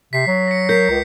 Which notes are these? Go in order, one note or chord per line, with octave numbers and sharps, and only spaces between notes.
C3 B6 C7
F#3
A#6 C#7
A#4 G6 B6 C7
C#2